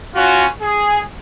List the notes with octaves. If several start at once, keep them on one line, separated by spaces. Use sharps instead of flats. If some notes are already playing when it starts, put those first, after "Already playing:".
C#4 F4 F#4
G#4